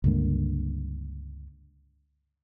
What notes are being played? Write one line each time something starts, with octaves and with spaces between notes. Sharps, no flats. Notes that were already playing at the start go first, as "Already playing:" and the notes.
C#2 G2 D3 A#3